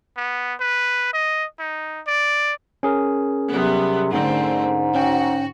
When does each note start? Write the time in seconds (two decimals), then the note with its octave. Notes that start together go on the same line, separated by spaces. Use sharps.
0.17 B3
0.60 B4
1.13 D#5
1.59 D#4
2.07 D5
2.83 C#4 G#4 A#4
3.52 C3 F#3 G3 B3
4.12 G#2 D3 A3 C4
4.95 C#4 F#4 G5